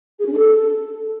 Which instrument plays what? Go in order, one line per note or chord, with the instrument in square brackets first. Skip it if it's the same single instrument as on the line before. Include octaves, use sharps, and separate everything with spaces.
[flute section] G#4
C#4
D4
A4